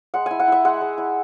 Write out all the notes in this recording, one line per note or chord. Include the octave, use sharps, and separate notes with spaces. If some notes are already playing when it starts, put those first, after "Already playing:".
G#3 F#5
E4 G#5
F#5
E4 E5
G#3 F#5
G#3
E4